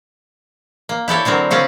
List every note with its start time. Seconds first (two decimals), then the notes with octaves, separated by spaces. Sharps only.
0.89 A#3
1.08 E4 G4 A4 C#5
1.25 D3 F#3 C4 A#4
1.51 C#3 C4 C#4 D5